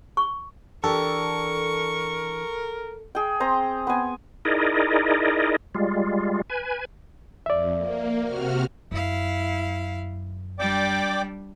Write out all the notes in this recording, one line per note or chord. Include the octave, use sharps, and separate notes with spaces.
C#6
E3 D4 G4 A4 A#4 C#6
G#4 G5
C4 C5 A#5
B3 G#5
D#4 E4 G#4 A#4 D5 D#5
G3 G#3 F4
B4 G#5
F2 D5 E5
A#3
C3 F#4 F6
F#2 E4 F5
G3 D4 D5 G5 D6